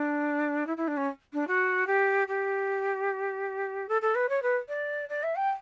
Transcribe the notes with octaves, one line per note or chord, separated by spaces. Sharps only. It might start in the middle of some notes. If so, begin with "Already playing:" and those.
Already playing: D4
E4
E4
D4
C#4
D4
F#4
G4
G4
A4
A4
B4
C#5
B4
D5
D5
E5
G5